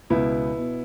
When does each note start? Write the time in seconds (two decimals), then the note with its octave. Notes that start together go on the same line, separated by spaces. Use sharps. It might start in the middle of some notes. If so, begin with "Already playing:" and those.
0.10 C#2 B2 B3 E4
0.57 B2